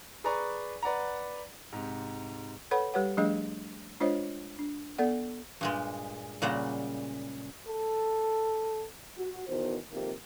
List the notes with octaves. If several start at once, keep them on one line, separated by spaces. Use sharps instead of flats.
G#4 B4 D5 G#5 A#5 C#6
B4 D5 F#5 A#5
G#2 C3
A4 B4 C#5 F#5 B5
G3 G4 B4 C#5 F#5
F3 G3 A3 D4 G#4 D#5
G#3 D4 F4 C5 C#5 D#5
D4
B3 A4 D5 F#5
G2 A#2 G#3
A#2 C#3 G3 G#3 F#5 A#5
A4
F#4
E2 B2 D#3 C5
F2 C3 D#3 A#3